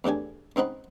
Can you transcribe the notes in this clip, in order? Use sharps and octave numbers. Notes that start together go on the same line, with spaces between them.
E2 A2 D4 G4 G#5
C#2 C4 D#4 F#5 B5